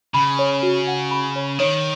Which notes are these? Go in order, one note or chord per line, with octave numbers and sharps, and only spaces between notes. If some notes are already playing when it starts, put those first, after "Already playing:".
C#3 B5
C#5
F#4
F#5
B5
C#5
D#3 C#5